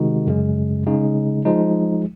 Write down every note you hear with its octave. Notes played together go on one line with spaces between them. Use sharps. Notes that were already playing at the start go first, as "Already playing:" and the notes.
Already playing: C3 D#3 G#3 D#4 F#4
F#2 C#3 G#3
C#3 G#3 D#4
F3 G#3 D#4